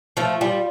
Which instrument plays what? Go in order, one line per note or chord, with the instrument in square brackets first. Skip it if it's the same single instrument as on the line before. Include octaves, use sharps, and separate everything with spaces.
[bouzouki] F3 A3
[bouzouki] G3 [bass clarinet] F4